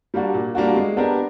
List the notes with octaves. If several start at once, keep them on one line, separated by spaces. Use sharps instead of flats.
G3 A#3 D4 F#4
A#2
G3 A#3 D4 F#4
G#3
B3 D4 G4 A#4